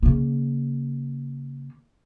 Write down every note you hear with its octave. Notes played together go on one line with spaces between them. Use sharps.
C#3 A#3